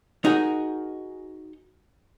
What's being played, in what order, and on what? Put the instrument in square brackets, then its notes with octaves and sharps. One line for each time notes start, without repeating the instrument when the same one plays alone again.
[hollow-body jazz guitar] D#4 F#4 G#4 A#4